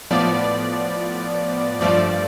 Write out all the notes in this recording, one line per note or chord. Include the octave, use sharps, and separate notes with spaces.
A2 F3 B3 D5
G2 F3 A3 D5